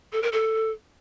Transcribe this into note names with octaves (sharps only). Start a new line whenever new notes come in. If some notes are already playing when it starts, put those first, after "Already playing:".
A4
A#4
A4